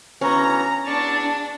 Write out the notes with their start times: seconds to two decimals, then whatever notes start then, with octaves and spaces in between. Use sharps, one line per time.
0.21 D2 E3 B3 C#4 A#5
0.86 E2 D4 D5 A5 C#6